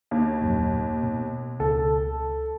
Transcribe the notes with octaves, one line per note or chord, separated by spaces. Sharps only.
D#2
D#1 F#2 A#2
B2
C#2 A4